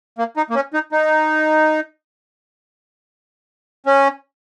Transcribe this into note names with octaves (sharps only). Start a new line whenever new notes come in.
A#3
D#4
A#3
C#4
D#4
D#4
C#4